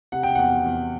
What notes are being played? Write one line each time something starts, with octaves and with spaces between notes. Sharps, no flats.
C3 F#5
G5
E2 F#5
E2